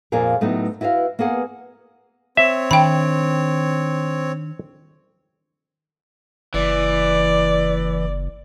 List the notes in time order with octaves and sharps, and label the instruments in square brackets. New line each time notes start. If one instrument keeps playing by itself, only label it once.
[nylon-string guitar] F2 A#2 F4 G#4 A#4
A2 F#3 A3 B3 D#4 B4
E4 F#4 B4 E5 F5
A#3 B3 G#4 F#5
[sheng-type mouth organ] C4 C#5 [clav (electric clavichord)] E5
[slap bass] D#3 D4 [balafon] G5 B5
[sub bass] F#1 [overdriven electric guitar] E3 [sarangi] D5